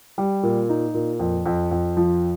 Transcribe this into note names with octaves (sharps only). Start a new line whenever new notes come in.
G3
A#2
D#4
A#2
F2
F2
F2
F3